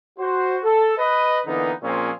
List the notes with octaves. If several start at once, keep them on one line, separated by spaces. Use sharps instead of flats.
F#4 C5
A4
B4 D#5
D3 E3 A#3 B3 D#4
A#2 F3 C4 C#4 F4 G#4